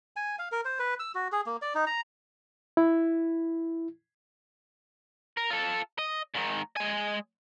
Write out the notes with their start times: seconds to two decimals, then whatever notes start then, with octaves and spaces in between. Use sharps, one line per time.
0.16 G#5
0.39 F5
0.52 A#4
0.65 C5
0.79 B4
1.00 E6
1.15 F#4
1.32 G#4
1.46 A#3
1.62 D5
1.75 D#4
1.87 A#5
2.77 E4
5.37 A#4
5.50 F4 A4
5.99 D#5
6.35 G#2 D#3
6.76 G#3 G#5